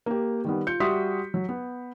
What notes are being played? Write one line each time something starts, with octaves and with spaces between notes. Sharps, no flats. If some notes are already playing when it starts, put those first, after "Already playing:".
A#3 G4
D#3 G3 B3
F4 G6 C#7
G3 F#4 E5 C6 D#6 B6
F#3
B3